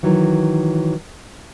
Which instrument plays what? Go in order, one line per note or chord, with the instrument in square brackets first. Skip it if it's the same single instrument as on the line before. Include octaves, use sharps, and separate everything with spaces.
[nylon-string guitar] D#3 E3 F#3